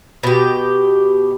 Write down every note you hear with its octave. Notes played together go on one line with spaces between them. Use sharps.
B2 G4